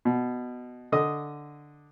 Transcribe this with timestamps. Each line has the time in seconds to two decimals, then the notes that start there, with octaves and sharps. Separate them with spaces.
0.05 B2
0.92 D3 D#5 D#6